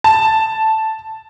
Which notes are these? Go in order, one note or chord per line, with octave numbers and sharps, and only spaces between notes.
A5